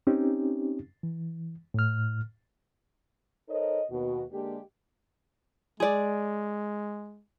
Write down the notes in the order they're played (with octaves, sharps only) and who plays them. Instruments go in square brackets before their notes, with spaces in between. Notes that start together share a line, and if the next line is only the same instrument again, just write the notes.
[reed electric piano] C4 C#4 D#4 G4
E3
A2 F6
[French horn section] D#4 A4 A#4 C5 C#5 D#5
D#2 B2 F#4
D3 G#3 A#3 D4 G4
[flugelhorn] G#3 [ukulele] G#4 D5